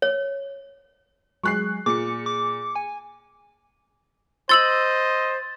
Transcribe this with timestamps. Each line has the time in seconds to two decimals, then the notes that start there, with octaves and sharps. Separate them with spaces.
0.02 C#5
1.43 F#3 G#3 G#4 C#6 F#6 C7
1.86 A#2 G#4 D6 C#7
2.26 D6
2.76 G#5
4.49 C5 D#5 C6 E6 A6 F#7